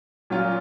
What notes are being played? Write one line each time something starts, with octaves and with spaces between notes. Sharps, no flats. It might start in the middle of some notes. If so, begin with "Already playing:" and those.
A#2 F#3 C#4 F4